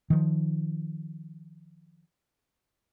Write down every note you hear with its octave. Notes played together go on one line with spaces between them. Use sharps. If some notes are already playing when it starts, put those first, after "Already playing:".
D#3 F3